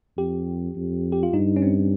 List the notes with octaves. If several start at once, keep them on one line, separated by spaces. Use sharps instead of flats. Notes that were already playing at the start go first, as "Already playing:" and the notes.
F2 G4
F2
G4
F4
G2 D#4
C#4
C4